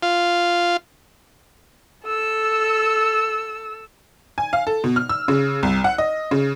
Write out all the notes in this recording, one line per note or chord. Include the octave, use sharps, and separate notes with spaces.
F4
A4 E6
G#5
F5
A4
B2
F6
E6
C#3
C2
F#5
D#5
C#3